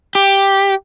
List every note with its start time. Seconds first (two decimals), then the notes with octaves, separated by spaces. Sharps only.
0.15 G4